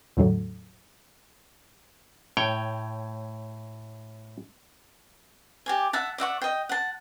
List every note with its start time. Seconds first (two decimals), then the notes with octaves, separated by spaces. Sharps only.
0.17 E2 A2 D3 F#3 A3
2.37 A2 C#5 G5
5.66 G4 D5 G#5
5.93 E5 F#5 A5
6.18 D5 E5 F#5 C#6
6.42 D#5 G5
6.69 F#5 A5